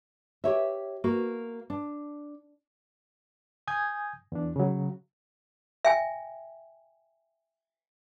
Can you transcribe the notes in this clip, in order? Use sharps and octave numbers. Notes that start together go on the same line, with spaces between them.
G4 C#5 E5
A#3 F#4
D4
G#5 D#6 G6 G#6
E2 D4
C#3 F#3
E5 G5 G#5